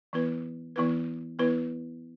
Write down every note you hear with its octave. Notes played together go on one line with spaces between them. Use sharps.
E3 B3 E4 B4
E3 B3 E4 B4
E3 B3 E4 B4